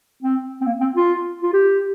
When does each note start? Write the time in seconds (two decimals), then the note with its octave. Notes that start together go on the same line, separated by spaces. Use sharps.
0.23 C4
0.61 C4
0.66 A#3
0.81 C4
0.96 F4
1.42 F4
1.53 G4